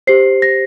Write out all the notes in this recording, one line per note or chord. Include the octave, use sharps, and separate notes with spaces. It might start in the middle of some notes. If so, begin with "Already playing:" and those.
G4 C5 C7
A#6